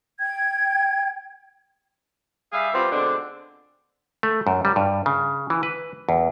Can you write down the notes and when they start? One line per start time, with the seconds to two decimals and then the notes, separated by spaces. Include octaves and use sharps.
0.19 G5 G#6
2.53 G3 G#4 E5 F5
2.73 G3 B3 C4 F4 G4
2.91 B2 D3 G#3 C4 D4
4.23 A3
4.47 F#2
4.65 G3
4.76 G2
5.06 C#3
5.50 E3
5.63 B4
6.09 E2